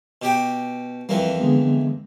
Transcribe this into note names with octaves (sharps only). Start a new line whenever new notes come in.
B2 G4 G5
F2 E3 G3 A#3
D3 G#3 B3